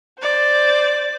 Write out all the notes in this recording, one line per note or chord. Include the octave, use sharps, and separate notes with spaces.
C5 D5